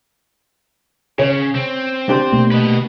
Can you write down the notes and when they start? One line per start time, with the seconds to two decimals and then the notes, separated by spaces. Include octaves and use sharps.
1.19 C#3 C#5
1.55 C4
2.09 D4 G4 C5
2.32 B2 A3 A#3
2.51 B4 D#5